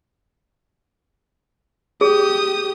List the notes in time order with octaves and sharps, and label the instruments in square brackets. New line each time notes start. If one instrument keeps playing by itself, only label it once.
[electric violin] G4 D#6 [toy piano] G#4